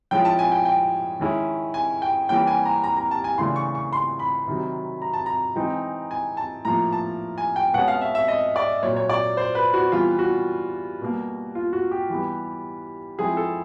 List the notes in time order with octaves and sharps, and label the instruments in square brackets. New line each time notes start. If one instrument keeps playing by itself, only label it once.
[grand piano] F3 G#3 C#4 E4 G5
A5
G#5
G5
G5
D#3 G#3 C#4 E4
G#5
G5
E3 G3 A#3 C#4 G5
G#5
A#5
A#5
A#5
A5
G#5
C#3 E3 A3 D4 C6
C#6
C#6
C6
B5
C3 D#3 F#3
A#5
A5
A#5
E3 G#3 C4 D#4
G#5
A5
A2 F3 A#3 A#5
A5
G#5
G5
B2 G#3 C#4 F#5
F5
E5
E5
D#5
D5
A#2 F#3 A#3 C#5
C#5
D5
C5
B4
F#4
E3 G3 B3 F4
F#4
B2 G3 A#3
F4
F#4
G4
E3 G3 B3
F3 G#3 C4 E4 G#4
A4